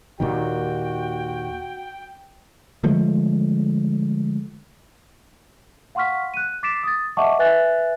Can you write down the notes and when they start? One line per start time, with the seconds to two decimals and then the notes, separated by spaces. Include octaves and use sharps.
0.20 D#2 A#2 D#3 F#4 G5
2.83 D3 F3 G#3 A3
5.95 F5 F#5 C6 C#6 F6 B6
6.34 F#6 D#7
6.63 D6 A6 B6 C7 D7 E7
6.83 D#6 A6
7.17 D#5 E5 F#5 A5 C#6 D6
7.39 B4 E5 G#5 F#6 A6